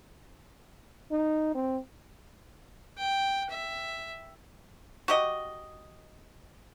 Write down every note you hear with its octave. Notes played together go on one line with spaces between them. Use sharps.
D#4
C4
G5
E5
F#4 G4 D#5